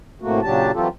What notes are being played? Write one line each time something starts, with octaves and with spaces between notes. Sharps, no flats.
A2 C3 A3 A#3 F#4
A#2 C#3 F#3 D4 G4 A5
E3 F#3 C4 F4 G4 A4